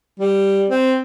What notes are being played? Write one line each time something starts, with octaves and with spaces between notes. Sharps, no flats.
G3
C4